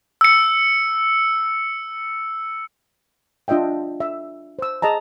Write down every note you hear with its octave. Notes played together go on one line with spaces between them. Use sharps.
E6 C#7
D4 F4 D#5 E5 G5
E5
C5 E6
G#4 D#5 A5 A#5